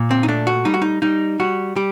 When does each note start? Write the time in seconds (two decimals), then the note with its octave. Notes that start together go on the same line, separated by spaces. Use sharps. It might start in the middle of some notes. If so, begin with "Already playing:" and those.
Already playing: A#2
0.11 C4
0.23 D#4
0.28 A3 D4
0.47 F#4
0.65 G3 D#4
0.74 F#4
0.82 D#4
1.02 G3 D#4
1.40 G3 F#4
1.76 G3 G4